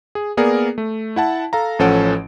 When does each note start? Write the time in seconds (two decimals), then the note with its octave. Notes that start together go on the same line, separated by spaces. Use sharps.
0.15 G#4
0.37 A#3 B3 G#4 A#4 D5
0.78 A3
1.16 E4 F#5 A5
1.53 A4 F5 A#5
1.79 A1 F3 C#4 A4 F#5 D7